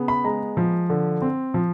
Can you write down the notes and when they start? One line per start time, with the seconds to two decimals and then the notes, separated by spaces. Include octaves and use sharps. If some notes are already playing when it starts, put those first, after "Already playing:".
Already playing: C#3 B3
0.08 B5
0.24 G#3 A#5
0.57 F3
0.90 D3
1.22 C4
1.54 F3